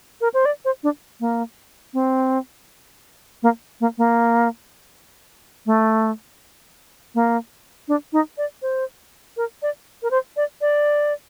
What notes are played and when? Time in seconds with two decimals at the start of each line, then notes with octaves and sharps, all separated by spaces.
0.21 A#4
0.34 C5
0.45 D5
0.65 C5
0.83 D4
1.20 A#3
1.94 C4
3.43 A#3
3.81 A#3
3.98 A#3
5.66 A3
7.15 A#3
7.88 D4
8.13 D#4
8.38 D5
8.62 C5
9.37 A#4
9.62 D5
10.03 A#4
10.11 C5
10.37 D5
10.61 D5